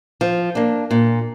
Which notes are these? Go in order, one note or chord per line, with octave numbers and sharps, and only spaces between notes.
F3
A#3 D4
A#2